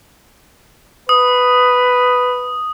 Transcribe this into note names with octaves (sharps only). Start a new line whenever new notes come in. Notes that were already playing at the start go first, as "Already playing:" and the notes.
B4 D#6